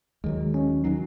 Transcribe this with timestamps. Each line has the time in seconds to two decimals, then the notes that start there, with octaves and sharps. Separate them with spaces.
0.24 D#2 D#3 F#3 G#3
0.54 C#4
0.84 D#3 F#3 D#4